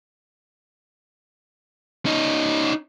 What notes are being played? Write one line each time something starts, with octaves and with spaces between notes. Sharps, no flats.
C#4 D#4